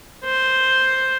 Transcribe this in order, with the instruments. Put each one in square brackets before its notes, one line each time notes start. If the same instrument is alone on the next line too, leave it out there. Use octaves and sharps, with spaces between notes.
[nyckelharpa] C5